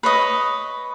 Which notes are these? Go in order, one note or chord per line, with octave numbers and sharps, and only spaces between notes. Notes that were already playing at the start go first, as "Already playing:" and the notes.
B4 C#5 D#5